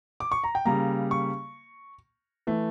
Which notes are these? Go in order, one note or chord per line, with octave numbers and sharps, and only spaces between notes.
D6
C#6
A#5
G5
C#3 G3 A#3 A#5
C#6
E3 A3